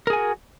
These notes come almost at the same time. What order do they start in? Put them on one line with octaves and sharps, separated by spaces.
A#4 G#4 G#5 F#4